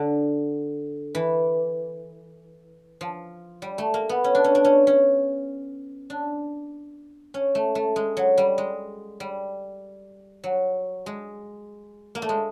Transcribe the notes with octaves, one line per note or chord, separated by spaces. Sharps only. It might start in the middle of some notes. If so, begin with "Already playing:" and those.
Already playing: D3
E3
F3
G3
A3
A#3
B3
C#4
D4
C#4
D4
C#4
C#4
D4
C#4
A3
A3
G#3
F#3
G3
G#3
G3
F#3
G#3
A#3
A3
G#3